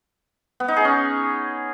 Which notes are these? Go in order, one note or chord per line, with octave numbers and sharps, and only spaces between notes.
B3
D#4
G#4
C#4